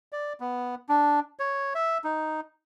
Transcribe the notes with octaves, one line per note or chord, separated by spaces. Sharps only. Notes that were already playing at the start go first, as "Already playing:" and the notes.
D5
B3
D4
C#5
E5
D#4